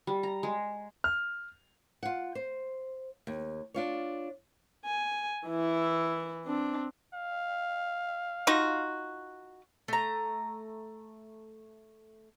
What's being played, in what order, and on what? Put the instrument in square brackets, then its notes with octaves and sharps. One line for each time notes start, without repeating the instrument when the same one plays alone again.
[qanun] G3
A#5
G#3
[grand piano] F6
[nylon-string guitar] F4 F#5
C5
D#2
D4 F4 C#5
[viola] G#5
E3 E4
C4 D4
[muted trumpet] F5
[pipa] D#4 F4 F#4
[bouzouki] A3 A#5